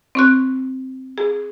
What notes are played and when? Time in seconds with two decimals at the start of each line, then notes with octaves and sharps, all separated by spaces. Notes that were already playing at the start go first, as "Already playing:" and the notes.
0.15 C4 C#6 F#6
1.18 G#4